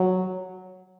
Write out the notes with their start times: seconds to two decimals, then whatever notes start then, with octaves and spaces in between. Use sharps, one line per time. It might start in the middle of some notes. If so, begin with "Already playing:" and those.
Already playing: F#3